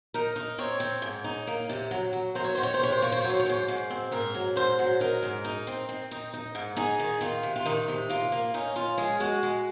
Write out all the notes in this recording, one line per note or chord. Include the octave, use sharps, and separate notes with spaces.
D#4 A#4
D#4
C4 C#5
C4
G#2
D#4
A#3
C3
F#3
F#3
F#3 C5
C#5
D#3 C5
C#5
C5
C3 C#5
C5
A#3 C#5
C5
F#3 C#5
C5
C#5
G#2 C5
G#2
C4
G#2 A#4
F#3
G#2 C5
F#3
D#4 A#4
G#2
D#4
C4
C4
D#4
D#4
G#2
D#4 G#4
D#3
D#3 F4
C3
F4
D#3 D#4
C3
A#3 F4
A#3
C#4 D#4
C#4 F4
G#3 G#4
G#3 F#4
G#3